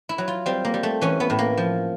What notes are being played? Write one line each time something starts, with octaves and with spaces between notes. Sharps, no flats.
E4
F#3
F4
G3 C4
A#3
G3
A3
E3 C#4
B3
A2
A#3
F3